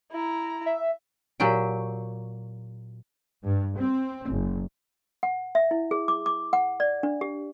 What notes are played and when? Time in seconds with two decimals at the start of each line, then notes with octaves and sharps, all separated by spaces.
0.12 E4 A#5
0.66 E5
1.40 A#2 F#3 G4 G5
3.43 G2
3.76 C4
4.29 F#1
5.23 F#5
5.55 E5
5.71 E4
5.91 G#4
6.08 D6
6.26 D6
6.53 F#5
6.80 D5
7.03 D4
7.21 G4